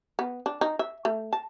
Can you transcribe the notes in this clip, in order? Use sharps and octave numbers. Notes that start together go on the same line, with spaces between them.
B3
D4
D#4
E5
A3
A5